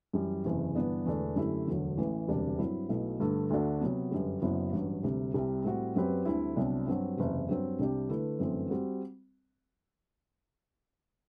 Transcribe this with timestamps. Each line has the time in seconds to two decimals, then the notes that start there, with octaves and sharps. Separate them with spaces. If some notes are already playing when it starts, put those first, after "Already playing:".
0.13 F#2 E3 G3
0.45 F#1 E2 C3 E3
0.75 G1 G2 E3 B3 D4
1.05 E1 E2 D3 A3 D4
1.36 F#2 D3 A3 E4 G4
1.67 E1 D2 D3 F#3
1.97 A1 A2 E3
2.28 E1 D2 C3 G3 D4
2.58 G2 F#3 C4 E4
2.89 B1 B2 A3 E4
3.20 G2 D3 A3
3.50 D2 D3 A3 D4 F#4
3.81 C3 F#3 B3
4.11 G1 F#2 D3 G3
4.42 F#1 F#2 F#3 B3 E4
4.72 A1 G2 F#3
5.03 D2 C3 G3
5.34 C2 C3 G3
5.64 A2 G3 C4 F#4
5.95 F#2 F#3 C4 G4 B4
6.25 D2 D3 G3 C4 E4
6.56 C2 C3 F#3 B3 D4
6.87 G2 F#3 C4 F#4
7.17 F#1 E2 C3
7.48 G2 F#3 C4
7.79 C2 C3 G3 D4 G4
8.09 D3 A3 E4 B4
8.39 G1 F#2 E3 A3 C4
8.70 G3 C4 F#4